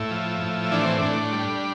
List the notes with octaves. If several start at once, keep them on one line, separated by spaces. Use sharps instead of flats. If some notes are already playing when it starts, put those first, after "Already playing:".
Already playing: A2 E4
F3
A2
E3 D4
C4
A2 D4
G3